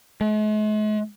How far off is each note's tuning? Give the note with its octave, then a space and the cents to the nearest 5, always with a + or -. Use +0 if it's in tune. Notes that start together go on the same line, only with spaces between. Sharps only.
G#3 +45